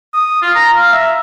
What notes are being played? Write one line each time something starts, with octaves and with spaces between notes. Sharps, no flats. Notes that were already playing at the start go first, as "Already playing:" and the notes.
D#6
F4
A#5
F5
E5